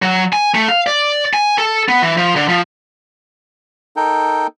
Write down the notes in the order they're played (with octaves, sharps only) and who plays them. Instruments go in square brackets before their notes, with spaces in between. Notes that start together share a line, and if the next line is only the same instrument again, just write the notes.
[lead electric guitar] F#3
G#5
A3
F5
D5
G#5
A4
B3
E3
F3
D3
F3
[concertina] D#4 A4 A#4 G5